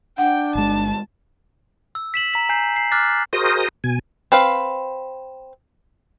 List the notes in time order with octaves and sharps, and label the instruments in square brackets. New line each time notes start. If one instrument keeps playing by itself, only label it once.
[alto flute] D4 [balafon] F#5 [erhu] G5
[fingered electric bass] G1 G#3 [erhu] A5
[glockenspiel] E6
B6 E7 F#7
A#5 B6
G#5 A#5 G6 C7
C7
D6 F6 F#6 A6 C7
[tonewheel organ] F#4 G#4 A#4 C5 D#5 D#6
B2 G#5
[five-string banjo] C4 B4 F5